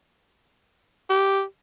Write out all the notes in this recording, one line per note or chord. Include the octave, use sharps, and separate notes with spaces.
G4